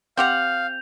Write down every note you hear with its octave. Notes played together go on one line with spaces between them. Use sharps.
C4 G4 F5 F#5 G6 F7